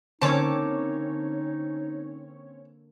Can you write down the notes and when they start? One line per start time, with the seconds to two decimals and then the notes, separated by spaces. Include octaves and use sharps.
0.21 D3 A#3 C4 C#4 D#4 C#5 A5 D6